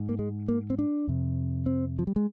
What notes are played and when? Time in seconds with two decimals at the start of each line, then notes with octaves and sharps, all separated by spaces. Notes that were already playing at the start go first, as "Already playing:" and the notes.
Already playing: G#2
0.09 A#3
0.19 G#3
0.48 A#3
0.70 C4
0.79 D4
1.07 F2 C3
1.66 C4
1.99 F3
2.07 G3
2.16 G#3